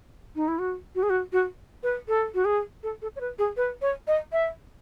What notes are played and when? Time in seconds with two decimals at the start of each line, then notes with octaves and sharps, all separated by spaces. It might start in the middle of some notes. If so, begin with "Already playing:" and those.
0.36 D#4
0.48 E4
0.59 F#4
0.95 F#4
1.03 G#4
1.10 F#4
1.33 F#4
1.83 B4
2.08 A4
2.34 F#4
2.45 G#4
2.83 A4
3.02 A4
3.16 C#5
3.21 B4
3.39 G#4
3.57 B4
3.82 C#5
4.07 D#5
4.32 E5